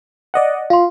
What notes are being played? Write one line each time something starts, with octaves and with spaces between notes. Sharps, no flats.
D5 D#5 F#5
F4 F5 C6